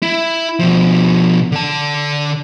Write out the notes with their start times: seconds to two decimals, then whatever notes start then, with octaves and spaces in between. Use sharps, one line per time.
0.03 E4 E5
0.59 B2 F3
1.52 D3 A5